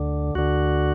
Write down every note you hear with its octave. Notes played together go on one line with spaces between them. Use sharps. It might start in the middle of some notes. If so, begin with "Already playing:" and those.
Already playing: D2 D3
D2 D3 F#4